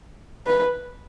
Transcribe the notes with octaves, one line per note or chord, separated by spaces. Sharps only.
B4